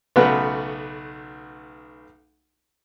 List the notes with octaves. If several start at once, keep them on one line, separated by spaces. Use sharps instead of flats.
B1 C#3 A3 B3 F#4 B4